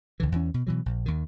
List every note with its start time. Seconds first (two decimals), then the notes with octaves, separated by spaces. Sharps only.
0.20 C#2 D3 E3
0.32 E2 E3 C#4
0.54 B2
0.67 B2 E3 F#3
0.86 A#1
1.06 D#2 D#3